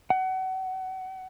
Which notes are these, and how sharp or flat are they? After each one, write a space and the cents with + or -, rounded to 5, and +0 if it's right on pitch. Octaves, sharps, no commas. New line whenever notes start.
F#5 +30